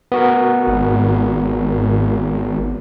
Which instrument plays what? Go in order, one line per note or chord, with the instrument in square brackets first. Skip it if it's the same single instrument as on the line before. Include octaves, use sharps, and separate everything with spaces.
[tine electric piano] B3 F#4 A#4
[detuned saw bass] G#1